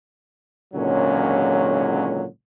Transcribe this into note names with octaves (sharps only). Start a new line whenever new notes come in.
G#1 C#2 A#2 D3 F#3 C#4